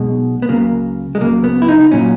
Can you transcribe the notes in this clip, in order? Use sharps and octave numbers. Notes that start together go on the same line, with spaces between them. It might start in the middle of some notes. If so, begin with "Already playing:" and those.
Already playing: B1 B2 G#3
B3
C#2 C#3 F#3 A#3
G#3
C#2 C#3 F#3 A#3
B3
E4
D#4
A#2 F#3 C#4